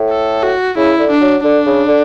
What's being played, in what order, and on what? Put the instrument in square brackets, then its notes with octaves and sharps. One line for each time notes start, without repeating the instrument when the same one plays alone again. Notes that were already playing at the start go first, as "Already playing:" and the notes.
Already playing: [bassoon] A2
[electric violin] A4
F#4
[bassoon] C#3 [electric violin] E4
[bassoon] D3
[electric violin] D4
[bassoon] F#3
[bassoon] D3 [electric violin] D4
[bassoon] C#3
D3